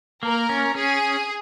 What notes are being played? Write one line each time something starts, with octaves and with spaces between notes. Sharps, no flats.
A#3 A#4
C#4
C#4 G#4